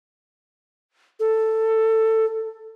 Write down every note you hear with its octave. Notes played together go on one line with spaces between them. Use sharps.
A4